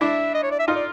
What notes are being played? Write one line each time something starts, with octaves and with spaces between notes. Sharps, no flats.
D4 E4 E5
D#5
C#5
D5
E5
D#4 F4 D#5
D5